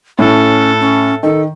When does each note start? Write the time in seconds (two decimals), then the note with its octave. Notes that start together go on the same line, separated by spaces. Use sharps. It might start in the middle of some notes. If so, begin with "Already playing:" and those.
0.19 A2 C#4 A4
0.80 C#4
1.23 D#3 A4